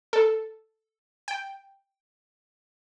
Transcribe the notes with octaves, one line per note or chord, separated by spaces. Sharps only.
A4
G5